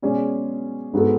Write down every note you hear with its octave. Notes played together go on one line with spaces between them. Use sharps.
B2 G#3 C#4 G#4 D5
G#2 G#3 B3 F#4 A4